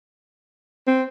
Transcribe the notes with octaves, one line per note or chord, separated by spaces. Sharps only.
C4